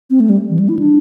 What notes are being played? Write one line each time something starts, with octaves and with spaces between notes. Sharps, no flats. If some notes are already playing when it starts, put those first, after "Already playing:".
C4
A3
G3
E3
G3
E4
D4